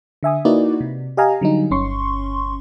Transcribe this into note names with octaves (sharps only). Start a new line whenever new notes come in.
D3 E5 G#5 D#6
A#3 D#4 E4 F#4 B4 D5
C3
G4 D#5 F5 G#5 A#5
D3 F#3 G3 D#4
G1 C#4 C6 C#6